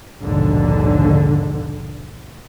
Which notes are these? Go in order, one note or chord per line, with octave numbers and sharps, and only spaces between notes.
A#1 D#2 G#2 B2 D3